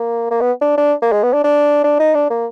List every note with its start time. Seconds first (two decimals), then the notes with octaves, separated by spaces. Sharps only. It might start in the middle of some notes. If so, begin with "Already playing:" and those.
Already playing: A#3
0.31 A#3
0.41 B3
0.61 D4
0.77 D4
1.02 A#3
1.12 G#3
1.23 B3
1.33 D4
1.44 D4
1.84 D4
1.99 D#4
2.14 D4
2.30 A#3